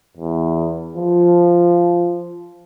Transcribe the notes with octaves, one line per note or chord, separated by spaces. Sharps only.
E2
F3